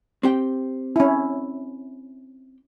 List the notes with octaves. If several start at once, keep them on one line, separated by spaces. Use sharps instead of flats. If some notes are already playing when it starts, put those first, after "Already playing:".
C4 G4 G5
C#4 E4